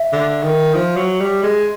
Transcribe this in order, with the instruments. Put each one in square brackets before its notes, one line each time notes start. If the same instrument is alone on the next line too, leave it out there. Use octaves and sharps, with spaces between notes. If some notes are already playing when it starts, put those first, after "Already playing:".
Already playing: [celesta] E5
[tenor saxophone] D3
D#3
F3
F#3
G3
G#3